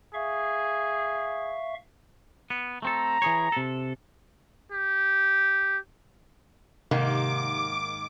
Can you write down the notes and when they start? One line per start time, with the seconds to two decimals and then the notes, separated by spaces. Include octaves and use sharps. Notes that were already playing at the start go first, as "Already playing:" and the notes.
0.14 G#4 E5 F5 C#6
2.50 B3
2.82 A3 C4 A4 A#5
3.22 E3 G#4 C#5
3.52 C3 A4
4.72 G4
6.91 G#2 C3 D#3 A#3 D6